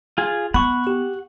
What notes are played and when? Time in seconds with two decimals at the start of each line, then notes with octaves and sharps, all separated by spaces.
0.18 F4 G#4
0.54 B3 F#5 B5 C#6
0.87 G4